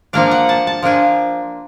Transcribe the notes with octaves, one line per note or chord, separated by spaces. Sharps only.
F3 A#3 D4 F5
F#5
A5
A5
F3 A#3 D4 G#5